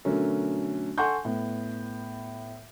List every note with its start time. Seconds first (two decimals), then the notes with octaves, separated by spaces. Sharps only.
0.05 B2 D3 F#3 A3 C#4 A#4
0.98 A4 F#5 G#5 C6 C#6 G6
1.25 A2 B3